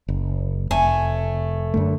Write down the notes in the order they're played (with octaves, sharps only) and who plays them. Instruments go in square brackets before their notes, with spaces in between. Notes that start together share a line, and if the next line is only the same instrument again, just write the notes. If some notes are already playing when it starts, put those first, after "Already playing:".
[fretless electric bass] F#1
[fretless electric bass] F1 [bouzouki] A3 G#5
[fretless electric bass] F#2 D3 A3